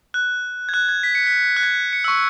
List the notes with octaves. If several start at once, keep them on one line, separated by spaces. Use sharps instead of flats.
F#6
G#6
F#6
G#6
B6
C#7
B6
F#6
G#6
C#7
E6
C#6